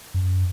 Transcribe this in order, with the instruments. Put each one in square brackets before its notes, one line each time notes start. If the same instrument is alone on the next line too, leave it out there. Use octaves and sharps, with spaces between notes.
[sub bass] F#2